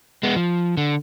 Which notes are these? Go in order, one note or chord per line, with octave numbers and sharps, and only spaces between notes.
G#3 B3
F3
D3